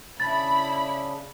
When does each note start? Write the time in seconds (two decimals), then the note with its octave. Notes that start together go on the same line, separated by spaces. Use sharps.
0.20 C#3 D4 E4 B5 A6